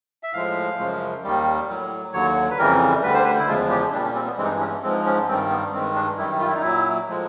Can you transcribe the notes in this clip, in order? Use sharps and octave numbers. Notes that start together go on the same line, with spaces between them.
E5
A2 F3 G#3 F5
F#2 C#3 F3 G#3
D#2 D#3 G3
A2 F#3
D#2 D3 F#3 C#5
B4
F2 C#3 E3 G3 A#4
D2 D3 G3 B4
C5
B4
E4
E2 C#3 F3 G#3 F4
G4
A#2 G3 D4
C#4
C4
B3
G2 E3 G#3 C4
D#4
D4
C#4
B3
G#2 F3 G#3 C4
C#4
G2 D#3 G3 C4
B3
G2 D#3 G#3 C4
D4
F#2 D#3 G3 E4
F4
E4
D#4
A#2 F#3 E4
A2 F3 G#3